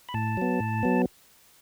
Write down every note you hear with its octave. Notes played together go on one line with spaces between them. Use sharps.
B5
A2 A5
F#3 B3
A2
F#3 B3